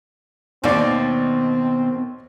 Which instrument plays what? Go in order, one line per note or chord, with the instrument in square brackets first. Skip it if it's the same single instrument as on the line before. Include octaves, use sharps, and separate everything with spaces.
[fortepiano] D#2 D5 [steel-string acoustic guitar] B2 D#3 [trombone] C4